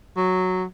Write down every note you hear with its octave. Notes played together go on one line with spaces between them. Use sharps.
F#3